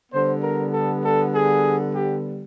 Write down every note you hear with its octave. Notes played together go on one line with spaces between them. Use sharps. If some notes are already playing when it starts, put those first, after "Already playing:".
D3 G3 B3 C5
A#4
A4
A4
G#4
G4